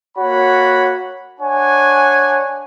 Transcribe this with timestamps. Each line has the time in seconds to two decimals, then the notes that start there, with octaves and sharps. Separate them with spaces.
0.18 A#3 F#4 C#5 F#5 B5
1.40 D4 C#5 F#5 G#5